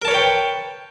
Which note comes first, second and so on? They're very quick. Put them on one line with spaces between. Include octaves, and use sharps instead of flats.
A#4 A5 C#5 B4 G5